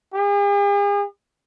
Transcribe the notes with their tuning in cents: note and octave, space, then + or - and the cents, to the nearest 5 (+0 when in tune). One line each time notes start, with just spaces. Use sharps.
G#4 -45